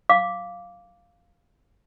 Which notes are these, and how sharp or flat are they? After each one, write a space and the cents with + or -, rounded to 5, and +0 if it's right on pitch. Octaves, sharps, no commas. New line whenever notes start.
F5 +0 D6 -10